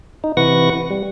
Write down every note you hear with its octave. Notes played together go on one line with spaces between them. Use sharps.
D#4
C3 E3 B4 F#5 C#6 A#6
G3